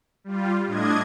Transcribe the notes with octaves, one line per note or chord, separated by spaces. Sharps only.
G3 F4
A2 D4 D#5 G#6